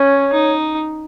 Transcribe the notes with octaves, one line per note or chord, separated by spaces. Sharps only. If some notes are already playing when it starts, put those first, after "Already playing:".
Already playing: C#4 C#5
D#4